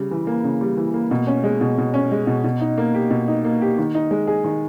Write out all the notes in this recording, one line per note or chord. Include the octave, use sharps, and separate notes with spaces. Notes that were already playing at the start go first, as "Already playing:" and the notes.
Already playing: C#3 G3
E3
A#3
C#3
G3
E3
A#3
B2
C#4
G#3
B2
B2
C#4
G#3
B2
B2
D#4
A#3
G4
B2
D#4
A#3
G4
D#3
D#4
G#3
G#4
D#3